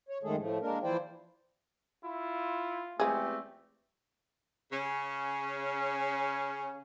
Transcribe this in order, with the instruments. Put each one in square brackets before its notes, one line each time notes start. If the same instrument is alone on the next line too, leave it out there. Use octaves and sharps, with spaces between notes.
[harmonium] C#5
F#2 D#3 G#3 A3 G#4 A4
A2 F3 A3
G#3 A#3 D4 A#4
E3 F3 E4 C5 D5 G5
[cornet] E4 [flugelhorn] F4
[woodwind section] E2 A3 C4 [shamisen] F3 G#3 G#4 [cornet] G4
[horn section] C#3 C#4